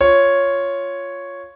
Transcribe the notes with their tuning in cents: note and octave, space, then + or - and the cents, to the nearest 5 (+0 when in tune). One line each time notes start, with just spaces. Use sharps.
F4 +0 C#5 +0